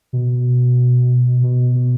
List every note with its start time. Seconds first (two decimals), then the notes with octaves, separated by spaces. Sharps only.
0.13 B2
1.43 B2
1.75 B2